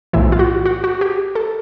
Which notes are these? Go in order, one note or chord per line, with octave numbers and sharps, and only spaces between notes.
B1 A2 E3 E4
F4
F#4
F#4
F#4
G4
A4